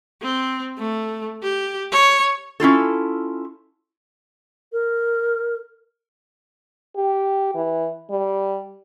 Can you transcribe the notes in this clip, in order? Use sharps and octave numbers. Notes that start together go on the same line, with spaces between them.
C4
A3
G4
C#5
C#4 E4 F4 A4
A#4
G4
E3
G3